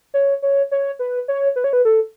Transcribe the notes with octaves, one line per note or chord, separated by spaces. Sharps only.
C#5
C#5
C#5
B4
C#5
B4
C#5
B4
A4